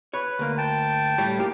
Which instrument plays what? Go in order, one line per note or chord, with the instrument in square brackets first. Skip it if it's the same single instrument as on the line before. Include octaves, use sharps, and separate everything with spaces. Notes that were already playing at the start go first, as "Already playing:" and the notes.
[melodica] B4 [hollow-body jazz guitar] C#5
[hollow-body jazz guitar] D2 A#3
[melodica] G5 A5
[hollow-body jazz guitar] A2 G3 C#5
A#3 G4